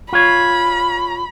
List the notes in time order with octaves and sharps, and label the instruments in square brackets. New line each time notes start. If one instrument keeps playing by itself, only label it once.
[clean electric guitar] F4 C#5 [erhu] B5